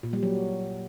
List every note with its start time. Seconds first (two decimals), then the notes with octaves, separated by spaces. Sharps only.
0.03 A#2
0.13 G3
0.23 F#3